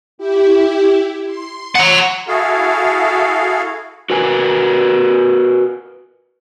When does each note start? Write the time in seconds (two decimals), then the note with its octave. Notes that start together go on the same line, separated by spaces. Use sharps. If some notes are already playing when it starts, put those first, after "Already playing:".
0.18 E4 G4
1.26 C6
1.76 F#5 A#5
2.28 E4 F#4 G#4 A4 F5
4.10 F#4 A#4 B4 G#5